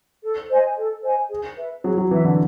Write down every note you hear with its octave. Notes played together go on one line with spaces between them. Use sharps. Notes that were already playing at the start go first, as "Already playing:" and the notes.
A4
C5 D#5 G#5
A4
C5 D#5 G#5
G#4
B4 E5
F#3 G#4
F#3
E3 B4 E5
D3